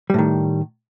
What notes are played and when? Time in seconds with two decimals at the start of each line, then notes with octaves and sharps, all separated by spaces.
0.10 G3
0.14 A2
0.18 D#3